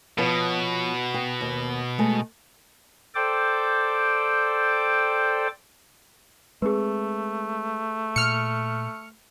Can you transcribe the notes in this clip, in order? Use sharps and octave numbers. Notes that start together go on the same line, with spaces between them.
B2 F3 B3 C#5
G5
D#2
G#3 A3
A4 C5 D5 G5 D6
G#3 A3 C4 G#4 B4
A#2 F6 C#7